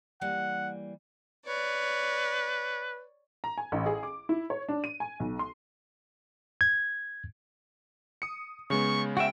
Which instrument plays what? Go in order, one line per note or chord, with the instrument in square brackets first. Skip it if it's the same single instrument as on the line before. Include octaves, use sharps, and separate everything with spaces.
[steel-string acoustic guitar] E3 G3 A#3 [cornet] F#5
[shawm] B4 [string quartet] C#5 D5
[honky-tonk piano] A#5
G#5
A1
G#4
D6
E4
C#5
D4
D#7
G#5
B1
C6
[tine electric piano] G#6
[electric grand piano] D#6 C#7
[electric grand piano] C#3 G#3 B3 [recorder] C#6
[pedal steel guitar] F#4 E5 [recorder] G5